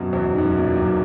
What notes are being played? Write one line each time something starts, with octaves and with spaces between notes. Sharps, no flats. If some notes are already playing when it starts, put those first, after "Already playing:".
Already playing: F#2 B2
E2
G#2
F#2
A#2
F#2